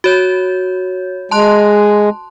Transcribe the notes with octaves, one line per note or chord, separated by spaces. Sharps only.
F#4 C#5 G6
G#3 A5 C6 F#6